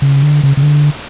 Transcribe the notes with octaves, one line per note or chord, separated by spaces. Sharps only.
C#3
D3
C#3
C#3
D3